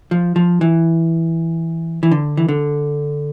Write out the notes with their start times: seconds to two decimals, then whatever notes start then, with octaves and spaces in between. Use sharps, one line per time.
0.11 F3
0.36 F3
0.61 E3
2.03 E3
2.11 D3
2.37 E3
2.48 D3